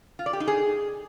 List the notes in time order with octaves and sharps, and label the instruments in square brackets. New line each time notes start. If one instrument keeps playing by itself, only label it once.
[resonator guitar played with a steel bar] F4
D5
G4
D#4
G#4